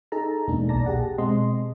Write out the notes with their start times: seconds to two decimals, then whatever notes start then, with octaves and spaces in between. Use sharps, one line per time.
0.12 D#4 G#4 A4 A5 A#5
0.47 E2 B2 G#3 A#3 D4 D#4
0.69 B1 A#2 D5 A5 A#5 A#6
0.85 G4 G#4 F#5 A5
1.18 B2 G#3 C4 D#5 C6